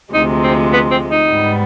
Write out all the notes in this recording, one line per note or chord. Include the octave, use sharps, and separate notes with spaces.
D2 C3 F3 G#3 D#4
C4
B3
C4
D#4
G#2 G3 B3